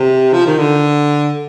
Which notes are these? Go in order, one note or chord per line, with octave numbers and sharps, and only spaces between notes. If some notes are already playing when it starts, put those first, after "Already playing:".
Already playing: C3
F3
D#3
D3